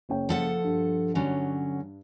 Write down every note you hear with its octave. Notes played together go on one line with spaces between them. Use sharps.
F#1 C#4 G5
F3 A4 F#5
G2
D3 F#3 C#4